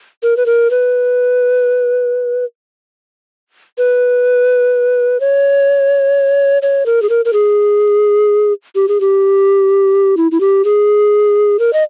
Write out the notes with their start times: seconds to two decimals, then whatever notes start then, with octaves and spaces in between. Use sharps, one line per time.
0.23 A#4
0.37 B4
0.46 A#4
0.71 B4
3.78 B4
5.20 C#5
6.62 C#5
6.86 A#4
7.02 G#4
7.10 A#4
7.25 A#4
7.33 G#4
8.75 G4
8.88 G#4
9.01 G4
10.17 E4
10.32 E4
10.40 G4
10.65 G#4
11.59 A#4
11.73 D#5